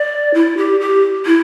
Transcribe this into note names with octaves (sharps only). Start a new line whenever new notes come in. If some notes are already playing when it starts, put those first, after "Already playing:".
Already playing: D5
E4
G4
G4
E4